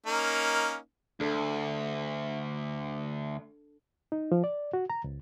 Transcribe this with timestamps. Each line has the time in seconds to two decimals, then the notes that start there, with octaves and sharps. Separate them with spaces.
0.06 A#3 C#4 D#4
1.20 D2 D4 A4
4.12 D#4
4.32 F3
4.44 D5
4.73 F#4
4.90 A#5
5.04 C#2